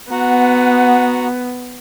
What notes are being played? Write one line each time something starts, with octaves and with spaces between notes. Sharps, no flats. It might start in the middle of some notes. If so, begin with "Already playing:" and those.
B3 F#4 F#5 A#5